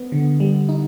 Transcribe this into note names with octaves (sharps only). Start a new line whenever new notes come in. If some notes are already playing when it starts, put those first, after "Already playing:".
Already playing: B3
D3
G3
D#4